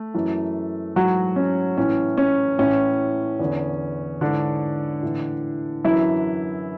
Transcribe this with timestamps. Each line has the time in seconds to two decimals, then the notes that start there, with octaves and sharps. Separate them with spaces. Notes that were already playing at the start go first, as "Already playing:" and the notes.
Already playing: A3
0.14 F#2 E3
0.95 G#2 E3 F#3 F#4
1.36 C#4
1.77 A2 E3 C#4
2.17 C#4
2.59 A2 E3 C#4
3.39 E2 D3
4.21 G#2 D3 E3 D4
5.03 A2 E3
5.84 F#2 E3 E4